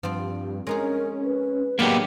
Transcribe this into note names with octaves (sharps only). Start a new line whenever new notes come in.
G2 F3 C4
G#3 C#4 D#4 G#4 A#4
B4
A2 F#3 A#3 B3 D4 G4 G#4 D5